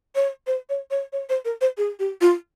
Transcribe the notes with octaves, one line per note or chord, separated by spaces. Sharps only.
C#5
C5
C#5
C#5
C#5
C5
A#4
C5
G#4
G4
F4